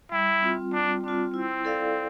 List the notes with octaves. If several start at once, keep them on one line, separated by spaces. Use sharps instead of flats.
G3 E4
C4 F4
G3 D4
C4 D4 F4
C4 E4
A4 D5 F5